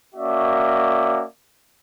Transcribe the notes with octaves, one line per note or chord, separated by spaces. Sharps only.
A#3 C#4 F#4 D5 E5